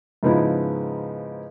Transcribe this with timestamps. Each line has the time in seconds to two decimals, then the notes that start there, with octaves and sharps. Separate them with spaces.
0.23 G#2 C#3 F3 B3 D#4 E4